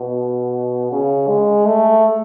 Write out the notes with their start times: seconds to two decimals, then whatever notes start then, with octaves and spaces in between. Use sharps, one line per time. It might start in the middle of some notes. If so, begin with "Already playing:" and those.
Already playing: B2
0.91 C#3
1.28 G#3
1.65 A3